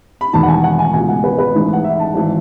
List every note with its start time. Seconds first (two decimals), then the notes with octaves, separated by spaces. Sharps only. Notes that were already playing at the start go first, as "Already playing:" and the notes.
0.21 B5
0.33 E1 E2 D#3 A5
0.43 F#5
0.48 G#5
0.64 F#5
0.79 G#5
0.93 C#2 B2 G#5
1.09 F#5
1.24 B4
1.38 B4
1.55 A1 G#2 E3
1.73 F#5
1.84 E5
2.00 A5
2.15 G#1 E3